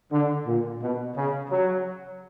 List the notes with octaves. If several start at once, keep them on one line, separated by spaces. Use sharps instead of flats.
D3
A#2
B2
C#3
F#3